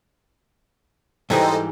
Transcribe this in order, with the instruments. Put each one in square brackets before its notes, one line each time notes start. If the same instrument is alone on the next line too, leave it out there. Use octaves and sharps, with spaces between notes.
[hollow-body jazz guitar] G#2 E3 G3 [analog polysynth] A4 C5 D#5 [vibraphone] G5 A#5